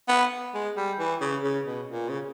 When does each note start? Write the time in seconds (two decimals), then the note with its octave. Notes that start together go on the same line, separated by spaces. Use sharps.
0.08 B3
0.54 G#3
0.77 G3
0.99 E3
1.21 C#3
1.44 C#3
1.66 B2
1.89 A#2
2.09 C#3